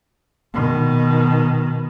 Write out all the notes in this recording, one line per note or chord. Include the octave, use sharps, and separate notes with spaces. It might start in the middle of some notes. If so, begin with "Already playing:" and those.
B2 D#3